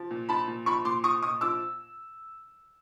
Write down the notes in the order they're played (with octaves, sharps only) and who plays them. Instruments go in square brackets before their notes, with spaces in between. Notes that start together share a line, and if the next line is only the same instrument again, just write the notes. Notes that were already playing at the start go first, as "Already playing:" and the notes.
Already playing: [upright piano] F3
A#2
F3 A5 B5
A#2
F3 B5 C#6
A#2 C6 D6
F3 C#6 D#6
A#2 C#6 D#6
F3 D6 E6